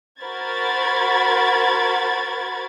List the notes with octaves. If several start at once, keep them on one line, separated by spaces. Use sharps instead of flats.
F#4 A#4 C5 B5 G#6 A6